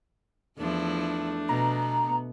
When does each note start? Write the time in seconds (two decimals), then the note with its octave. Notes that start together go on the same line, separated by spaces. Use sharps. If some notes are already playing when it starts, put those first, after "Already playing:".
0.58 E2 F3 A3 D4 E4
1.49 B2 B3 A#5